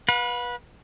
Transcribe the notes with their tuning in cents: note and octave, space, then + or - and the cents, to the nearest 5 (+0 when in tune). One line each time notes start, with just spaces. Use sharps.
B4 -20 F5 +45